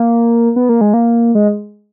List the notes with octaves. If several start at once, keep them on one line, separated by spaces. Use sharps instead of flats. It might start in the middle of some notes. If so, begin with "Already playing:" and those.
Already playing: A#3
B3
A#3
G#3
A#3
G#3